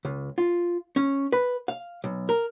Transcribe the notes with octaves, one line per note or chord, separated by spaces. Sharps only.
C#2
F4
C#4
B4
F5
B1
A#4